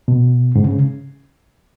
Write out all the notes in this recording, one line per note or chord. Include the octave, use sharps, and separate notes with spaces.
B2
G#2 C#3
C#3